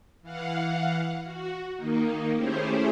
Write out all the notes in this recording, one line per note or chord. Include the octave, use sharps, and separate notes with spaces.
E3 F5 F#5
F#4
D#3 A#3 D#4
A3 C#4 E4 G4 G#4 C5